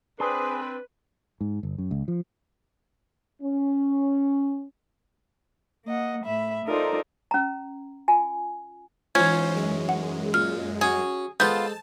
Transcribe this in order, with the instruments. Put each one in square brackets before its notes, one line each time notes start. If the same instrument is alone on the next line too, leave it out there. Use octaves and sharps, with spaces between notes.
[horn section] C4 D4 [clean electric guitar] G#4 [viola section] B4 [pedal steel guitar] C6
[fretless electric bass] G#2
G1
F#2
C#2
F3
[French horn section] C#4
[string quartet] A#3 D#5 F#5
A2 E5 B5
D#4 F4 A4 A#4 C5 D5
[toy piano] C#4 A#5
F4 G#5
[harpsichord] G#2 E3 [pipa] C#4 [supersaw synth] F4 C5 [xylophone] G#6
[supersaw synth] F#2 G#3
[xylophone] F#5
[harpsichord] A#2 [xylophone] F6
[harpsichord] C#4 F#4 [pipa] G#4
[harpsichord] G#3 A4 C5 [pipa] B3 F4 [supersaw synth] A5 [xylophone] G6